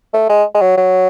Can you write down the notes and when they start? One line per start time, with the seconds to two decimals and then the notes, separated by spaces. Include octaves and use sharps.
0.14 A3
0.29 G#3
0.55 G#3
0.61 F#3
0.77 F#3